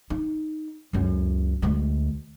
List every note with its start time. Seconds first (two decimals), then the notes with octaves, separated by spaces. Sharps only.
0.10 D#4
0.93 C#2 F#2
1.62 D2 G#3